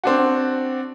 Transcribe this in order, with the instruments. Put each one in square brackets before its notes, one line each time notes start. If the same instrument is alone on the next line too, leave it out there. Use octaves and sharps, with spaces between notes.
[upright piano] C4 D4 F#4